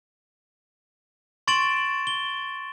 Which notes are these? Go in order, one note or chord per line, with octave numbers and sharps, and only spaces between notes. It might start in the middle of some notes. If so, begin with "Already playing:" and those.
C6 C#6 A6 D7 E7 F#7
G7